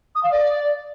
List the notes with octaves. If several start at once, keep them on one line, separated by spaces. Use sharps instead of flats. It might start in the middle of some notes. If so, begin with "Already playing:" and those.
D#6
F5
D5